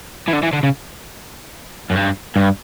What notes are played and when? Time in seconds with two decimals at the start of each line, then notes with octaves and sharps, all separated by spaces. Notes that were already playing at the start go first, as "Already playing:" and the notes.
0.28 E3
0.33 D3
0.43 E3
0.53 D3
0.63 C#3
1.90 F#2
1.96 G2
2.36 G2